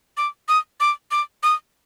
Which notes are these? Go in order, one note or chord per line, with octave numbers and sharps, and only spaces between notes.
D6
D#6
D6
D6
D#6